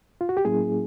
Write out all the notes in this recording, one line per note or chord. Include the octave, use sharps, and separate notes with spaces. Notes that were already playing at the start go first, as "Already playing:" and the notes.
F4
F#4
G4
A2 F#3 A#3 C#4 E4 G#4